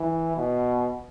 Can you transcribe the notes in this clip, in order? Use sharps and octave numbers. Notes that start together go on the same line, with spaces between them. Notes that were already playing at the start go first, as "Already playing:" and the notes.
Already playing: E3
B2